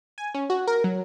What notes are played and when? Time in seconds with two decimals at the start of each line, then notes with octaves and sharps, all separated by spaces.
0.18 G#5
0.35 C#4
0.50 F#4
0.67 A#4
0.84 F#3